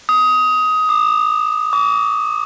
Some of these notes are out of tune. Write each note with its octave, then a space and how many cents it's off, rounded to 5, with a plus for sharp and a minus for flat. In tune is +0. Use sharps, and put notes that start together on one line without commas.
D#6 +15
D6 +40
D6 -45